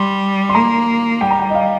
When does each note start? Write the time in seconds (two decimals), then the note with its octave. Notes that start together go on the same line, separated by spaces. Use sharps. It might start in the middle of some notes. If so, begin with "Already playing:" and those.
Already playing: G3 C6
0.49 C6
0.55 A#3 A#5
1.21 G3 G5
1.31 A#5
1.39 G5
1.50 D#5
1.54 F5